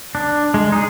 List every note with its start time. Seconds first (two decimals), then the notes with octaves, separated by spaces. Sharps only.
0.15 D4
0.54 G#3
0.72 D#4 G#4